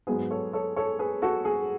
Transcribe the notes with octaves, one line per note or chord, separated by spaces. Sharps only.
G#2 F#3 B3 G#4 B4
A4 C#5
A4 C#5
A4 C#5
G#4 B4
F#4 A4
G#4